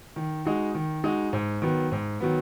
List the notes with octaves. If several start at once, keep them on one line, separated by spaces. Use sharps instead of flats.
D#3
G#3 D#4 F#4
D#3
G#3 D#4 F#4
G#2
D#3 F#3 B3
G#2
D#3 F#3 B3